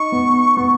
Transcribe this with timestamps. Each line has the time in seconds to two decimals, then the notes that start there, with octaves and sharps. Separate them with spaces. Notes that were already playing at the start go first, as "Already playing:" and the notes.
Already playing: D#4 C#6
0.12 B3
0.57 B3